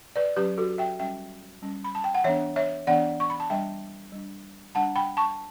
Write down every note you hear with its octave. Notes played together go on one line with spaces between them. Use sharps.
B4 D5
F#3 C#4 G4 B4
F#4 A4
E5 G5
G3 C#4 E5 G5
G3 C#4
B5
A5
G5
F#5
E3 B3 D4 C#5 E5
C#5 E5
E3 B3 D4 D5 F#5
C#6
B5
A5
G3 D4 E5 G5
G3 D4
G3 D4 F#5 A5
G5 B5
A5 C#6